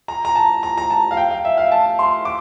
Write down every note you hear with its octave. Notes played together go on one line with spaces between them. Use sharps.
A#5
A#5
A5
A#5
A#5
A5
F5
G5
F5
E5
F5
A5
C6
D6